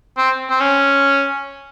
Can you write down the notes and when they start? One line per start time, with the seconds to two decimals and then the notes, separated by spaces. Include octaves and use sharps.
0.18 C4
0.50 C4
0.60 C#4